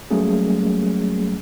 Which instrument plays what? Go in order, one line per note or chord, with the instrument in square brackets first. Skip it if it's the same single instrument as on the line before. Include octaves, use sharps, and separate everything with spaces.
[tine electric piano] F#3 G3 A3 A#3 C#4 G#4